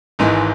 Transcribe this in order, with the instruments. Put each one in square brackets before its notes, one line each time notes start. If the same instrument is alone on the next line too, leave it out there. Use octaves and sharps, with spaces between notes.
[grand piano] G#1 G#2 E3 G#3